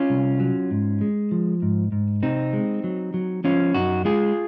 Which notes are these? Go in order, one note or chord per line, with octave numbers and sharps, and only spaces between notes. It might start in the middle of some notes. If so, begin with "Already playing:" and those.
Already playing: C#4 F4
C2
F#3
G#2
G#3
F3
G#2
G#2
C3 C4 D#4
G#3
F#3
F#3
F3 C#4 F4
F#2 D#4 F#4
G#3 F4 G#4